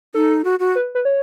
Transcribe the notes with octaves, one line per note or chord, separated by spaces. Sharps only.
D#4 A4
F#4
F#4
B4
B4
C#5